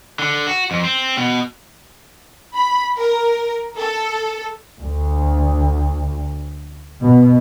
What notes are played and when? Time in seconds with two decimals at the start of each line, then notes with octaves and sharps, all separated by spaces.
0.19 D3
0.47 F#4
0.71 F2
0.85 C4
1.17 B2
2.55 B5
2.98 A#4
3.77 A4
4.80 D2
7.01 B2